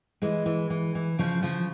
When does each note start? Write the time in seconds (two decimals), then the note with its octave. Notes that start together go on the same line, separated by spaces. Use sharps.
0.22 E3 G#3
0.46 E3
0.70 E3
0.95 E3
1.19 C#3 F3
1.42 C#3 F3